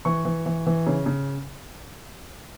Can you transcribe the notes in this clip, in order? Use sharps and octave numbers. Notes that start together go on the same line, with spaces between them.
E3 C#6
E3
E3
E3
C#3
C#3